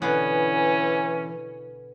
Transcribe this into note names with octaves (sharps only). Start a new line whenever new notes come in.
B2 D3 E3 B3 C#4